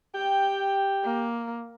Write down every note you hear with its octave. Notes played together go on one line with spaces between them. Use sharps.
G4 G5
A#3